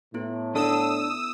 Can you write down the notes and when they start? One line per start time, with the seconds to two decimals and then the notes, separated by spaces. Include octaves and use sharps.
0.14 A2 B3 E4
0.55 D4 A4 D#6 E6